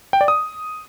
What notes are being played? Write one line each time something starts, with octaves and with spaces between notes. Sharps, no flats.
G5
D5
D#6